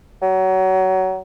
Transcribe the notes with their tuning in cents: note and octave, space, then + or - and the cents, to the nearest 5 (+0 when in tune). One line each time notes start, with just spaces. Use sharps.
F#3 +25